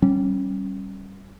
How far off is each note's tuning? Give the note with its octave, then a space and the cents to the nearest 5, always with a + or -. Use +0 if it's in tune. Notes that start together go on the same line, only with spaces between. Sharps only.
G3 -15 C#4 -20